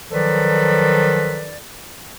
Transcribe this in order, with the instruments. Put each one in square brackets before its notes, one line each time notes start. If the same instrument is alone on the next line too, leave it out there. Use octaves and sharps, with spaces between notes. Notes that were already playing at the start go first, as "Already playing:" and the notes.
[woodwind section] D#3 F3 F#3 A4 B4 D5